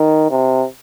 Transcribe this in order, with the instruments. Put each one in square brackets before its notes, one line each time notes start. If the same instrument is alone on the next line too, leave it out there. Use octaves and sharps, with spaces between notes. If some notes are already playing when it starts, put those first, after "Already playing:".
Already playing: [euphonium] D#3
C3